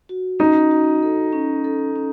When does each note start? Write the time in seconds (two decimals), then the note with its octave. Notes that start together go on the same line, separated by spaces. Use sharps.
0.09 F#4
0.39 C#4 D#4
0.71 F#4
1.03 A4
1.32 C#4
1.64 A4
1.96 C#4